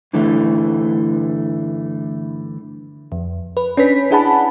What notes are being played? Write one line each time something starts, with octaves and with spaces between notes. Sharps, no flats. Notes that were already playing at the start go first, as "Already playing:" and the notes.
G2 D3 E3 A3
F2
B4
C#4 D4 B4 B6
D4 E4 G#4 F#5 A5 B5